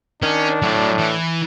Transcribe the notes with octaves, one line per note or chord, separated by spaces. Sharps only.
D#3 C#4 D4
A2 F#3 D5
E3